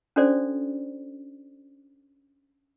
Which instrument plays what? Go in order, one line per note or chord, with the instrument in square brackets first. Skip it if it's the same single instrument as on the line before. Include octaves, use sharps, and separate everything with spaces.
[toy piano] C#4 D4 F#4 A4 C5 D5